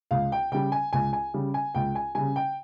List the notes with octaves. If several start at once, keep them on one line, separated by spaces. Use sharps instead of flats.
C#2 F5
G5
C#3 G3 G5
G#5
C#2 G#5
G#5
C#3 G3
G#5
C#2 G5
G#5
C#3 G3 G#5
G5